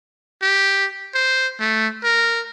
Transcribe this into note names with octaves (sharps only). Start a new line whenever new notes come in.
G4
C5
A3
A#4